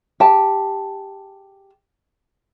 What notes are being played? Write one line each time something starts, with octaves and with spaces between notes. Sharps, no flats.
G4 G#4 A5